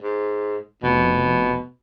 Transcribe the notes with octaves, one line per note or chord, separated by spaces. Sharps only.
G#2
F1 B2